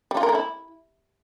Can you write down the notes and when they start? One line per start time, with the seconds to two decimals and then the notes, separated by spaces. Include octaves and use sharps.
0.11 G3
0.17 F4
0.23 A#4
0.29 A3
0.35 E4